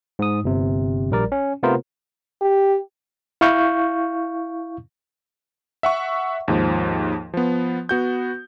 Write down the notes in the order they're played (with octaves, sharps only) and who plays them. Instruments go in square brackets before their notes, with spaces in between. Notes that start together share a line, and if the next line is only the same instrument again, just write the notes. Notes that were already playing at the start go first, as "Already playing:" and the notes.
[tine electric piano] G#2 D#6
G1 C3
A#1 G3 A#4 D5
C#4
C3 A3 B3 F4 A#4 C5
[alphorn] G4
[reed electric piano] E4 F5 C#6 G6
[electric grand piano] E5 F#5 C#6
D#2 G#2 F3
F3 B3
B3 F#4 G6